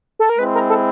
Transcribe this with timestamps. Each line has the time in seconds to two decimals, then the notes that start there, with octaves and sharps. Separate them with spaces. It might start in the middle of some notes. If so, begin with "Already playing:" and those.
0.19 A4
0.29 A#4
0.38 G#3 C4 E4 B4
0.54 A#4
0.69 A4